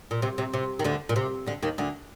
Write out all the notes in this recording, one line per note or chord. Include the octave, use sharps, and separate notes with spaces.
A#2
C3
C3
C3
D#3
D2 D3
A#2
C3
D2 D3
D#2 D#3
D2 D3